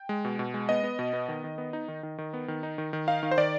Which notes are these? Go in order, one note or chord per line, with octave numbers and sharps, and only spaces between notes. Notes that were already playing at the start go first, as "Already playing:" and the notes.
Already playing: G5
G#3
B2
B2
G#3
B3 D#5
B3
B2
B3
D#3
D#3
B3
D#4
D#3
D#3
D#3
B3
D#3
D#4
D#3
D#3
D#4 F5
D#3
C5
D#3 D5